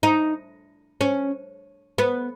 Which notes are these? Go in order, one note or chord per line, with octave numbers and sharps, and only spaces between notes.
D#4
C#4
B3